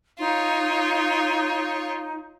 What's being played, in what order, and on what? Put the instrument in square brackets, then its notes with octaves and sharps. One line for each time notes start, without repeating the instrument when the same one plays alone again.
[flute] D#4 [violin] F4 C#5